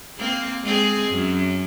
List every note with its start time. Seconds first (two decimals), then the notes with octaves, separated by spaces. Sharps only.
0.17 A#3 C4
0.63 G#3 C4 G#4
1.10 F#2